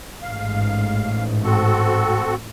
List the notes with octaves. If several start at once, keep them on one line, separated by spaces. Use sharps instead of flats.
A1 G#2 F5
C4 F#4 A4